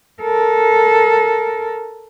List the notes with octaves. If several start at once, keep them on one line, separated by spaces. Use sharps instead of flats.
A4 A#4